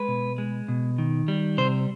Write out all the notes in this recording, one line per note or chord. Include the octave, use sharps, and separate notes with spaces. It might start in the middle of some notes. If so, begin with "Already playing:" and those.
Already playing: G#3 B4
B2
G#3
B2
D#3
G3
C3 C5